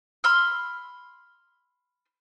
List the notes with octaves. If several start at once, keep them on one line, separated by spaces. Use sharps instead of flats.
B5 C6 E6 F6